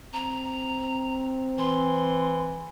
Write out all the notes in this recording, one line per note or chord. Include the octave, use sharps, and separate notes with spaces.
C4 A#5
E3 C6